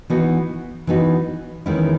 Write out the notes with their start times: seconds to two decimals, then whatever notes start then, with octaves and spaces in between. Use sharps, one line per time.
0.10 E3 B3 D#4 F#4
0.87 E3 B3 D#4 F#4
1.66 E2 D#3 G#3 C#4 E4